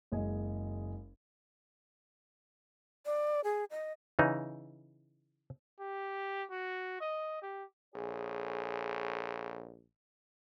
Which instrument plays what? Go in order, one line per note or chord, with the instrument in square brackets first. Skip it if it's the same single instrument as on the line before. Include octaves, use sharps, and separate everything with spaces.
[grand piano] F#1 G#3 D#5 G#5
[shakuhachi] D5
G#4
D#5
[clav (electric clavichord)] C#3 E3 D#4
[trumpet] G4
F#4
D#5
G4
[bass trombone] A#1 [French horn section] G#4 A4 C#5